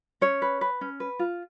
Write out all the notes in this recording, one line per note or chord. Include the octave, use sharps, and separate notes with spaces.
C#4 C#5
B4
B4
C#4
B4
F4